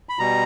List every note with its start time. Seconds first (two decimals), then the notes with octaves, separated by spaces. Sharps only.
0.09 B5
0.19 B2 G3 A#5